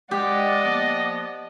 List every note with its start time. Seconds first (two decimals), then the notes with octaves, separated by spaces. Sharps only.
0.11 G#3 G4 D5 D#5 F#5
0.63 F3 A#3 B3